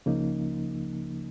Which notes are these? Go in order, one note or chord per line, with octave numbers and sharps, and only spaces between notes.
C#2 C#3 F3 A#3 D#4